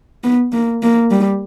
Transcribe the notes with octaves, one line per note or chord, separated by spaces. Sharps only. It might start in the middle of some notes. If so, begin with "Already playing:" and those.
B3
A#3
A#3
G3